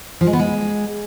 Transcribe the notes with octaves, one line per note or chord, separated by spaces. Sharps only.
F3
G#3
B3
G#3